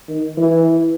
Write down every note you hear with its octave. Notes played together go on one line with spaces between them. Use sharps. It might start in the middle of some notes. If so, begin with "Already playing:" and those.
D#3
E3